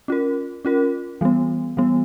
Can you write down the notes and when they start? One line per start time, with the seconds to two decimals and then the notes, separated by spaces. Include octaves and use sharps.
0.08 C#4 F4 A#4
0.65 C#4 F4 A#4
1.21 E3 G3 B3
1.77 E3 G3 B3